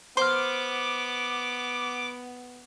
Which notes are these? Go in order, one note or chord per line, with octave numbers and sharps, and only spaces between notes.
B3 C5 C6 D6 F6